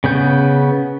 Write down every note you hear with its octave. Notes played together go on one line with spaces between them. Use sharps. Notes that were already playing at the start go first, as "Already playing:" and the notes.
C#3 B3 G6